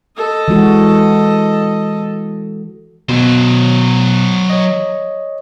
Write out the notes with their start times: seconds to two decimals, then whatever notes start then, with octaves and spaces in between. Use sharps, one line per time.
0.17 A4 D#5
0.48 E3 G#3 F#4
3.09 B2 F#3 C5
4.50 C#5 D#5